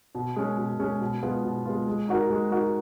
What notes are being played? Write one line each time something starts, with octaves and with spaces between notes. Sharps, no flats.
B2
G#3 C#4
B2
G#3 C#4
B2
G#3 B3 F4
B2
G#3 B3 F4
G#3
D#4 F#4 A#4
G#3
D#4 F#4 A#4